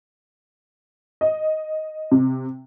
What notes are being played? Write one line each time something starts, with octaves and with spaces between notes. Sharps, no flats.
D#5
C3